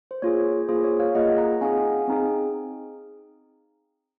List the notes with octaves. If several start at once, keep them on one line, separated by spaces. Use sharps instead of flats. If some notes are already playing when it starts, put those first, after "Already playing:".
C5
A#3 F4 G#4 C#5
A#3 F4 G#4 C5
C#5
C#5 F5
A#3 F4 G#4 D#5 F#5
F#5 A#5
C4 D#4 G#4 F5 G#5
C4 D#4 G#4